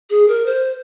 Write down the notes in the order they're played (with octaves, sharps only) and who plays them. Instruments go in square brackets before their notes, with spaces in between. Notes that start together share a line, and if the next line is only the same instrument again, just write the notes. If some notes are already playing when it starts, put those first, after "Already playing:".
[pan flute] G#4
A#4
C5